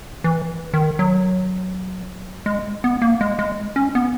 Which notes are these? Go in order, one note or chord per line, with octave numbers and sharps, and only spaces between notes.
E3
D#3
F#3
G#3
B3
A#3
G#3
G#3
C#4
B3